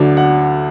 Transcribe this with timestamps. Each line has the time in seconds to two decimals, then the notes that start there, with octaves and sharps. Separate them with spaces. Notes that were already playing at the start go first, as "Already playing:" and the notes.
Already playing: D2 D3 F#3 D5
0.17 F#5